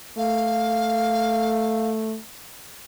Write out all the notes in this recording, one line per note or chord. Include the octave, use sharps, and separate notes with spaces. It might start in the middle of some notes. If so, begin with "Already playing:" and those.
A3 F5